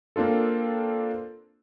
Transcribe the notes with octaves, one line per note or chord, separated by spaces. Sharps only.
A#3 C4 D4 F4 A4